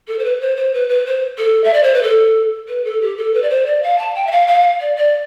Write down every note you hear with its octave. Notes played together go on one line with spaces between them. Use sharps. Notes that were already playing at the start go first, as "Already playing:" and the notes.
A4
C5
B4
C5
C5
B4
B4
C5
A4
E5
D5
C5
B4
A4
B4
A4
G4
A4
B4
D5
C5
D5
F5
A5
G5
E5
F5
F5
D5
D5